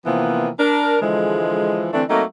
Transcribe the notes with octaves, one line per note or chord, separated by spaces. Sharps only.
C3 E3 F3 A#3 B3
D4 A#4
D3 E3 F3 G#3
D3 E3 A3 C4 D4
F#3 A3 A#3 C4 D#4